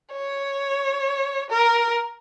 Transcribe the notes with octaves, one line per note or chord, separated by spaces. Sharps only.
C#5
A#4